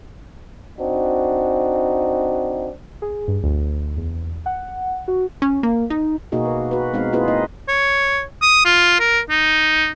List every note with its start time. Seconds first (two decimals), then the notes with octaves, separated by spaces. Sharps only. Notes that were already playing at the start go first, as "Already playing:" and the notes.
0.79 C4 D4 D#4 F#4
3.02 G#4
3.28 G2
3.43 D2
3.97 E2
4.46 F#5
5.08 F#4
5.42 C#4
5.63 A#3
5.90 D#4
6.32 B2 A#3 D#4 F#4 G#4
6.45 B4
6.71 F#4 B4
6.94 G#3 B3 C4 D#4 F5
7.13 A#3 C4 E4 F4 G#4 B4
7.28 A#3 D#4 D#5
7.69 C#5
8.42 D#6
8.65 F4
9.00 A#4
9.30 D#4